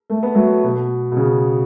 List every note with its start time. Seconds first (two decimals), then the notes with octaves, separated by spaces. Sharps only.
0.10 A3
0.23 B3
0.35 F#3 A3
0.64 B2
1.12 B2
1.17 C#3